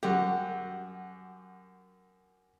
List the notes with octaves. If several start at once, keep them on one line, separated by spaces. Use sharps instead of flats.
F#2 F#4 G4 F#5